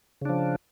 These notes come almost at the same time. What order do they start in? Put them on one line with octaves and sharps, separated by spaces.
C#3 D4 F3